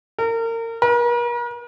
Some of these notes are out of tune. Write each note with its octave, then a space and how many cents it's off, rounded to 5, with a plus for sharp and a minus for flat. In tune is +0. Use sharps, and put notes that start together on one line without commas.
A#4 -30
A#4 +45